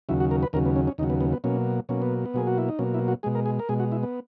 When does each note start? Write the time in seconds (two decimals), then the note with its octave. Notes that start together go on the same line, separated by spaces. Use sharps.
0.09 D#2 C#3 F#3 E4
0.20 F#4
0.31 A#4
0.43 B4
0.53 D#2 C#3 F#3 A#4
0.65 B3
0.76 C#4
0.87 C#4
0.98 D#2 C#3 F#3 D#4
1.10 B3
1.21 B3
1.33 B3
1.44 B2 F#3 A#3 C#4
1.89 B2 F#3 A#3 C#4
2.02 B3
2.26 B3
2.34 B2 F#3 A#3 G#4
2.47 F#4
2.58 E4
2.69 D#4
2.79 B2 F#3 A#3 C#4
2.94 E4
3.08 F#4
3.23 B2 G#3 G#4
3.35 A#4
3.46 G#4
3.59 A#4
3.69 B2 G#3 G#4
3.80 F#4
3.92 E4
4.03 B3